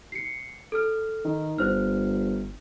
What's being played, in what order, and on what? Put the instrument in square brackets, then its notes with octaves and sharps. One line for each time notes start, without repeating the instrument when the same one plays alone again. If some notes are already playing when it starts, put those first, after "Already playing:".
[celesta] C7 C#7
A4 F6
[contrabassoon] D#3
[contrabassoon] G1 [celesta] C5 F6